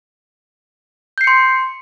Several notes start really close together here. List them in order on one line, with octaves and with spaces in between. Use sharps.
G6 C7 C#7 C6